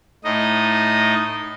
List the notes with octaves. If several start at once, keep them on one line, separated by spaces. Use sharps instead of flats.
A2 D#4 D#5